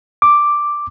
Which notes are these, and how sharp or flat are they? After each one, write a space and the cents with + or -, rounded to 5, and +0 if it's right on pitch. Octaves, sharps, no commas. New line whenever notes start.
D6 +0